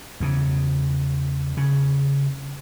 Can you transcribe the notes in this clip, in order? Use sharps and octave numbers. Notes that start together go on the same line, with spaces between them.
E2 C#3
C#3